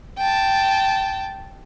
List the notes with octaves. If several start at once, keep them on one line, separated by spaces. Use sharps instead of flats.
G5 A5